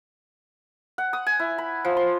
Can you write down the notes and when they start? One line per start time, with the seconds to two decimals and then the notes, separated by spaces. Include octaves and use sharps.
0.98 F#5
1.13 D#6
1.27 G#5
1.40 E4
1.58 B5
1.85 F3
1.97 C6